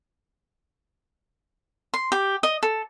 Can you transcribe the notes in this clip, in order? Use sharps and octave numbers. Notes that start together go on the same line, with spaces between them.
C6
G4
D#5
A4